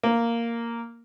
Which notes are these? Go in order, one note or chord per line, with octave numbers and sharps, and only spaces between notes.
A#3